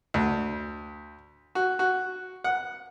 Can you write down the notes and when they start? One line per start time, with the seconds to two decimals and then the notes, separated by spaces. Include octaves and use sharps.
0.14 D2
1.55 F#4
1.79 F#4
2.44 F#5